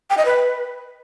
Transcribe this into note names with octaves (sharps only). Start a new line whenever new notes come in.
G5
D#5
B4